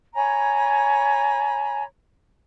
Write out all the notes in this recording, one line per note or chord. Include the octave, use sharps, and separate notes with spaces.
C#5 G#5 A#5 B5